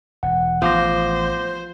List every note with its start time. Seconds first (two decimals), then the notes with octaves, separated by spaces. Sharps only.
0.23 E1 F#5
0.62 A1 F3 B3 C5 D6 A#6